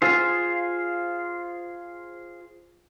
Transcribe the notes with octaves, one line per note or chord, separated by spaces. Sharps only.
F4 G#4 C5